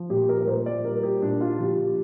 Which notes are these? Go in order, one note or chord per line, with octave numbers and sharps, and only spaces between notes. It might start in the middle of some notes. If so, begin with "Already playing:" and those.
Already playing: F3
A#2 G4
A#4
A#4
A#2 C5
D5
G3 A#4
G4
A#2 D4
F4
F3 G4